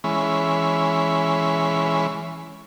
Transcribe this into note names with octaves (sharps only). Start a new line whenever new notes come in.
E3 G#3 C#4 B5